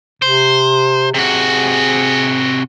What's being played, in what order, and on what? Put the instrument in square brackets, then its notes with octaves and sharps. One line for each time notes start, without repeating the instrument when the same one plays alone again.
[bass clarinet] C3 [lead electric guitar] C5
[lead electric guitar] C3 F#4 [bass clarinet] G#4